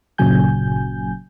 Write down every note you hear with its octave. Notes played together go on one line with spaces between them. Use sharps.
G1 A#2 C#3 F#3 G#5 G6